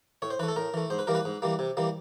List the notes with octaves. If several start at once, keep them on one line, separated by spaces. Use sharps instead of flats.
A2 C#5
C5
E3 A3 B4
A4
A2 A#4
E3 A3
G#2 C5
B4
E3 G3 A#3 A#4
B4
G#2
E3 G3 A#3
C3
E3 G3 A#3